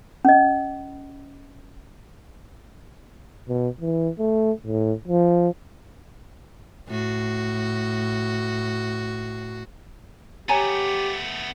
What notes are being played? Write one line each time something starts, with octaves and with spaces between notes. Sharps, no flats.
C#4 D#5
B2
E3
A3
A2
F3
A2 F#4
A3 B3 G4 C#5 G#5 A#5